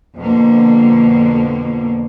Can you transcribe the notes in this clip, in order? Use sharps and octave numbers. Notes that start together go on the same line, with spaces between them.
F2 B2 D3 A#3